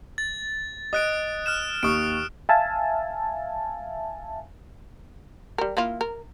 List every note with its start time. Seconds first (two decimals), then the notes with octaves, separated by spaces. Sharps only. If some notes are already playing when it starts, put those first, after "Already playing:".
0.18 A6
0.93 D#5 D#6 F#6 D7
1.46 F6 F#6 E7
1.83 D#2 C#6 D#6 D7
2.49 E5 F5 G#5 A5
5.58 G3 A#4
5.77 A#3 E4 F4
6.01 A#4